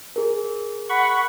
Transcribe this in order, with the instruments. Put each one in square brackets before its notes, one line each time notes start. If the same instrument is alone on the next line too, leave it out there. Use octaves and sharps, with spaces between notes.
[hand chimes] G#4 A#4
[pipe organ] F#5 B5 C#6